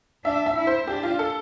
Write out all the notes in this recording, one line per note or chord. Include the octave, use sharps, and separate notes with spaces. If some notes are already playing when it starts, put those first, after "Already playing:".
D4 E5
E5
E4
C5
D4 G4
F4
A4